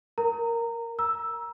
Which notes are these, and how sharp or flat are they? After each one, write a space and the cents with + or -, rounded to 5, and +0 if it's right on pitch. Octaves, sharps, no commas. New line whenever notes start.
A#4 +0 A#5 -20
A#5 +20 E6 +0